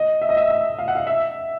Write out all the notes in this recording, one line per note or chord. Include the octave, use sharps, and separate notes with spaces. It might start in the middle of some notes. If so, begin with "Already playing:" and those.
Already playing: D#5
E5
D#5
E5
E5
F5
F#5
F5
E5